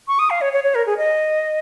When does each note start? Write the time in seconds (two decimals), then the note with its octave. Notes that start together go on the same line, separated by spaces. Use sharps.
0.08 C#6
0.19 D#6
0.30 F5
0.41 C#5
0.53 C#5
0.64 C#5
0.75 A#4
0.86 G#4
0.98 D#5